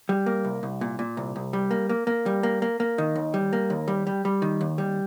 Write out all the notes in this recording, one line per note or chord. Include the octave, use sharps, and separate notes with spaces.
G3
A#3
C2
C2
A#2
A#2
C2
C2
G3
A#3
A#3
A#3
G3
A#3
A#3
A#3
D#3
D#2
G3
A#3
D#2
G3
G3
G3
D#3
D#2
G3